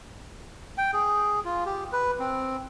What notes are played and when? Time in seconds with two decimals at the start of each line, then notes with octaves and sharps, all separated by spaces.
0.78 G5
0.93 G#4
1.45 F4
1.66 G4
1.92 B4
2.20 C4